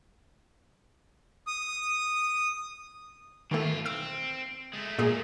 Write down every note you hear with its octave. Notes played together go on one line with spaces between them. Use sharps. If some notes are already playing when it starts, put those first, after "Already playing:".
D#6
B2 D#3 E3 A3 F4
C4 E6
G#3 A3
A#2 G#4